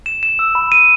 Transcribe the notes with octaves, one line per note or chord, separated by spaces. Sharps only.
E7
E7
E6
B5
D#7